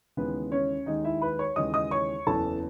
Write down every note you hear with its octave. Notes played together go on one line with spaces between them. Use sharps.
D#2 C#3 E3 G#3 B3 B4
C#4 C#5
D#2 D#3 G#3 D#4 D#5
E4 E5
B4 B5
C#5 C#6
D#2 C#3 E3 G#3 D#5 D#6
D#5 D#6
C#5 C#6
F#1 E2 C#3 E3 A4 A5